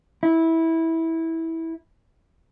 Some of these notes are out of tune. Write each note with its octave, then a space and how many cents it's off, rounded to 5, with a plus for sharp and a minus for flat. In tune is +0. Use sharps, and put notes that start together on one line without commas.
E4 -15